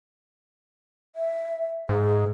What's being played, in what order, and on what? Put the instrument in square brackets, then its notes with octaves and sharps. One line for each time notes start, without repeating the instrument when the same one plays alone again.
[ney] E5
[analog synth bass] G#2 [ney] G#4